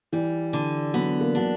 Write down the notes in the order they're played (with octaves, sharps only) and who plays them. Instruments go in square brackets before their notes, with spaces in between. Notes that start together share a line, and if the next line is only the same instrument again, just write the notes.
[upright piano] E3 [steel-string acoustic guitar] G3
[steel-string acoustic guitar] D3
[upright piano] F#3 [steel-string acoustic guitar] B3
[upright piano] A#3
[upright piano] F#3 [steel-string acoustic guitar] D4